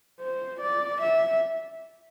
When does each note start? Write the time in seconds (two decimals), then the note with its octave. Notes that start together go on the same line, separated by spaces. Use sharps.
0.21 C5
0.61 D5
1.02 E5